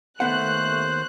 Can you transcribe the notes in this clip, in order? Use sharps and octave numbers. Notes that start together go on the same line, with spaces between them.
D#2 A3 B3 C5 F#5 F#6